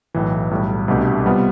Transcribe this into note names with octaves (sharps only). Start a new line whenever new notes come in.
B1 A2 E3
B1 A2 G3
C2 B2 A3 D4 G4
C3 G3 B3 F4